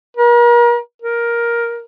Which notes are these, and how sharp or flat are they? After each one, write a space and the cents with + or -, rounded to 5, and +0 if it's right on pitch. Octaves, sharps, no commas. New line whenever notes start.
A#4 +40
A#4 +10